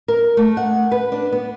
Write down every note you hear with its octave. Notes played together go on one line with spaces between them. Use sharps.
A#4
A3
F#5
B4
D4
B3